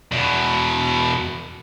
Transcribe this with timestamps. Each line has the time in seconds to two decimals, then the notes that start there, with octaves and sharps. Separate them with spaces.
0.12 E2 B2